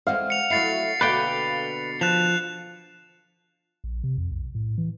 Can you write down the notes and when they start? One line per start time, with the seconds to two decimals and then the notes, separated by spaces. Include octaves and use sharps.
0.07 E3 G#3 C4 F5 F#5
0.30 C#7 F7
0.50 F#3 A3 E4 A6 C7 C#7
1.01 B2 D3 A#3 B4 D5 G5
2.01 F3 F#6 E7 F7
3.84 A#1
4.04 C3
4.18 F2
4.32 B1
4.55 A2
4.78 E3